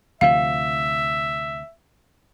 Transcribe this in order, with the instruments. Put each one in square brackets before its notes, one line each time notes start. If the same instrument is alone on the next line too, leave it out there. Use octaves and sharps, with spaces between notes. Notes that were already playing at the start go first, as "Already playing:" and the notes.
[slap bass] D2 C3 F3 [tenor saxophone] E5 [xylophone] F5